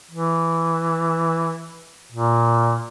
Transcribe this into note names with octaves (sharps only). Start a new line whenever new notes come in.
E3
A#2